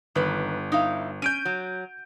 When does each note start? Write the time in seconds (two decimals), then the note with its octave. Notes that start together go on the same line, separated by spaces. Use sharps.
0.15 G1 D#3 A#3 B4
0.72 D#4 E4 F5
1.22 C#4 G6 D7 D#7
1.45 F#3